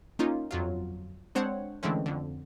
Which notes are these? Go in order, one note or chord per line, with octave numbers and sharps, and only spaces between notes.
A#3 C#4 D#4 F4
G1 F2 F#3 F4
G#3 C4 D4 C5 C#5 F#5
D3 E3 G#3 A3 C4 C#4
F2 D3